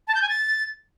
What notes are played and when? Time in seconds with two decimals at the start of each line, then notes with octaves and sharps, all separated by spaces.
0.08 A5
0.15 G6
0.22 G#5
0.29 A6